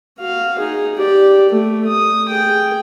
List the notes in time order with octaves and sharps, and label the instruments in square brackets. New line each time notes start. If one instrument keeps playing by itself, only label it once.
[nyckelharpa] F#4 F5
D#4 G#4
G4 D5
A3
D#6
G#4 G5